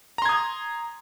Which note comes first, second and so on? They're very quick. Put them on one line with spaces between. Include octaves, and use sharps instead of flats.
A#5 C6 G#6 D#6